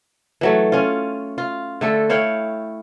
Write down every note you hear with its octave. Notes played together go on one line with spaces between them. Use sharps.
E3 F#3 A3
C#4 F4
F4
D3 A3 A4
E4 C#5 F5 G5